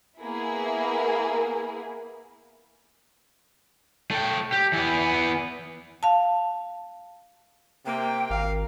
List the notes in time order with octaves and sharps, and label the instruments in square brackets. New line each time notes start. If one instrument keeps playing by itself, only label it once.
[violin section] A#3 B3 E4 G#4
[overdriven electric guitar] A3 G5
G4
E3 B3
[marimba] F5 A5
[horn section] C3 A#3 [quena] G5
[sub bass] G#1 [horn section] A#4 F5